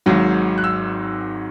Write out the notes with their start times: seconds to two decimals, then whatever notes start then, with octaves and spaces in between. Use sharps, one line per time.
0.06 G#1 G#2 D#3 F#3
0.58 F#6
0.64 E6